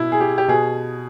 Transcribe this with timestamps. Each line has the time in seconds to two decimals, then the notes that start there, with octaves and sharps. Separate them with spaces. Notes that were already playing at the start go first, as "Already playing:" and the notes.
Already playing: B2 E4
0.12 G#4
0.20 G4
0.38 G4
0.48 B2 G#4